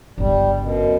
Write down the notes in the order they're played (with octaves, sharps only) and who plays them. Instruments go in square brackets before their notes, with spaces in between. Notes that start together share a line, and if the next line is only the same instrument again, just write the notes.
[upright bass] G1 C#2 [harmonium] G3
[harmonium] F#2 B2